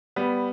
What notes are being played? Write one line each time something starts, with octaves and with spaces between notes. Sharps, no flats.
G3 B3